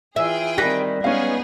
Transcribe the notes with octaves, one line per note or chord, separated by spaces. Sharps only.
E3 F4 G#4 E5 G5
D#3 G3 C4 F#6 A#6 B6
G#3 B3 C#4 D#4 G#4 F5